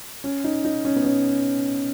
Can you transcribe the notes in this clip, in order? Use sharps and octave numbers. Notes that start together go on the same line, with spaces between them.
C#4
D#4
D#4
C#4
B3
C#4